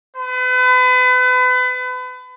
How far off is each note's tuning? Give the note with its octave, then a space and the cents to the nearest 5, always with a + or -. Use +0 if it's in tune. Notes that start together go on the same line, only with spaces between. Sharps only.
B4 +35